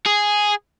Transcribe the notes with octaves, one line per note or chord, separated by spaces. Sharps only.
G#4